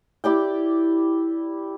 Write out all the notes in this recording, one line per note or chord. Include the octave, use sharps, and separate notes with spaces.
E4 G4 D5 G5